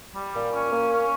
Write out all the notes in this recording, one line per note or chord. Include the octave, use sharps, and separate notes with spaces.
G3
A#2
C#4
A#3
C#4